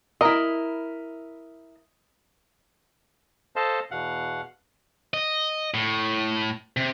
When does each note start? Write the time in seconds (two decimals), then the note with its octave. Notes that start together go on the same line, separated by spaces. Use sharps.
0.21 E4 A#4 D#5
3.56 A4 C5 D#5 F5 A5
3.91 E2 B2 F5 F#5
5.14 D#5
5.74 A2
6.77 C3